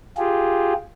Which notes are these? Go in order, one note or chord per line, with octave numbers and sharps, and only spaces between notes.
F4 G4 G#4